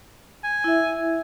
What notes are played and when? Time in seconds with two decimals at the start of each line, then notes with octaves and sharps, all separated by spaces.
0.44 G#5
0.64 E4 E5